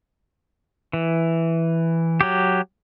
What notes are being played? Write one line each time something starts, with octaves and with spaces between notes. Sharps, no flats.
E3
F#3 G4